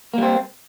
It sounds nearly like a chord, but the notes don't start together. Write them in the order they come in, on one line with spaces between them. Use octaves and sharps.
A#3 G3 C4